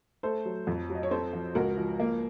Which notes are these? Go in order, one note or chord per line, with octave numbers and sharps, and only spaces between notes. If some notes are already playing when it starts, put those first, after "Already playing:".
A3 A4 C5
F#3
F2
F#3
D#5
C#5
C4 A4 C5
F3
C#2 F#4 A#4
F3
A#3